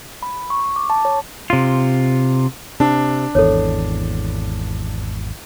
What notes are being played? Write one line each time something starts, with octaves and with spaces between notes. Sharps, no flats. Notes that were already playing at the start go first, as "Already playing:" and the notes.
B5
C#6
D6
A5
C#5
C3 F4
C3 D4
G#1 E2 A4 C#5